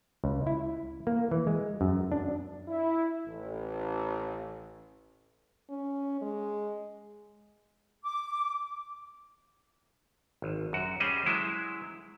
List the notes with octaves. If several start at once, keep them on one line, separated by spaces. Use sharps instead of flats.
C#2
E4
A#3
E3
G#3
F#2
D4
E4
A1
C#4
G#3
D6
G#1
F#2 F#4
G3 C#4 G#4 C5 D#5
F#3 G#3 E4 C5